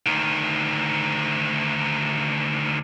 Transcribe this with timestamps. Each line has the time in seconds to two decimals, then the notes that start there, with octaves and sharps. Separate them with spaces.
0.06 D2 D#3